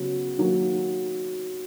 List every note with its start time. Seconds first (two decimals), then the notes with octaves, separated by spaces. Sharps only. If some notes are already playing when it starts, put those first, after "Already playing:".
Already playing: C#3 F#3 B3
0.37 D#3 F#3 A#3